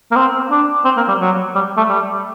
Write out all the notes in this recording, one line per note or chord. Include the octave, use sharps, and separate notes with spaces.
A#3
C4
D4
C4
A#3
G3
F#3
G3
A3
G3